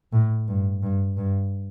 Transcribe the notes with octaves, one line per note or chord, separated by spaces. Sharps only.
A2
G2
G2
G2